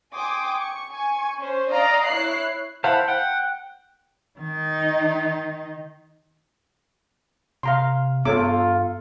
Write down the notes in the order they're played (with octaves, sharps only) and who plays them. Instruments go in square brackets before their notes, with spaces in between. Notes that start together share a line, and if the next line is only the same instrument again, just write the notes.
[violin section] G5 G#5 C6 D6 D#6
C#6
G#5 C#6
C#4 C5
D5 D#5 F5 A#5
E4 C#5 F#6 C7
[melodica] E4 F#5 B5 [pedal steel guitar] C5 F5 A5
[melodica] F#5 [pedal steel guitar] G5
[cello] D#3 D#4
[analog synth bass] C3 [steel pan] F5 A#5 C6
[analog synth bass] G2 [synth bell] B3 [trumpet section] F4 [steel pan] A4 C#5 D6